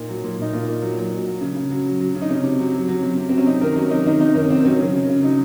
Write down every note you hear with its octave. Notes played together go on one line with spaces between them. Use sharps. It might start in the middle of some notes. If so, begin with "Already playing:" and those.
Already playing: A#2 D#4
F#3
A#2
A#2 D#4
A#2 F4
A#2
F#3
F#3
F#3
F#3
C#3
C#3
F#3
F#3
F#3
C#3
D#4
C3 C#4
C3
F#3
F#3
F#3
C3
C3
F#3 C4
C#4
C3 D#4
D#3 A#4
F#3 C#4
C3 D#4
D#3 D#4
C3 D#4
D#3 C#4
C3 C4
F#3 C#4
C#3
C#3
C#3
F#3 D#4